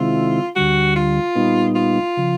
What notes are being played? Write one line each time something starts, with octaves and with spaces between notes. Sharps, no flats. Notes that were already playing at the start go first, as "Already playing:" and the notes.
Already playing: C3 D#3 G#3 C4 E4 F4
D2 D3 G3 F#4
F4
A#2 G3 B3 D#4
F4
C#3 F3